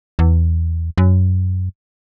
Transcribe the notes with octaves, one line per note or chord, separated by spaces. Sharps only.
E2
F#2